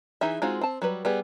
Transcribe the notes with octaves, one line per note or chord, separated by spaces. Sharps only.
E3 D#4 G#4 E5
G#3 C4 D#4 F4 F#4
C4 A5
F#3 G3 B4
G3 B3 G#4